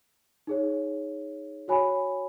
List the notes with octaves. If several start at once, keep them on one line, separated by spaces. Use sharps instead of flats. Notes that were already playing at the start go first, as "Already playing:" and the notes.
D#4 G#4 C#5
F#4 C#5 G#5 B5